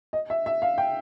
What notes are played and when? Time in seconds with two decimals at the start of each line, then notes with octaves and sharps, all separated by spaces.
0.13 D#5
0.30 E5
0.46 E5
0.62 F5
0.78 G5